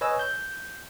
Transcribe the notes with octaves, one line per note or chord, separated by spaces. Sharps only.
B4 C#5 D#5 G#5 E6
G6